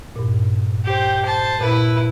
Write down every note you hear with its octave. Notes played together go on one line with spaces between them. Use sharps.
G2 A#2
G4 C5
C5 A5
A#2 E4 B4